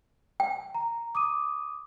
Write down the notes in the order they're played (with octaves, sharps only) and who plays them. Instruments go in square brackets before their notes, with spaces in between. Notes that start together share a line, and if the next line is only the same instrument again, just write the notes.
[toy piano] G5
[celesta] A#5
D6 D#6 D#7